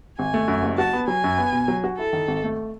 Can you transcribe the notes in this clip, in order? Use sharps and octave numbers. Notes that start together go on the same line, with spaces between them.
G#1 G#5
A3
F#2
F#1
F#4 A5
B3
F#3 G#5
F#2
B3
B2
F#3
F#4
E4 A4
D#3
G#1
A3